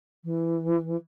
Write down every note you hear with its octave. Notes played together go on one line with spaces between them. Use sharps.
E3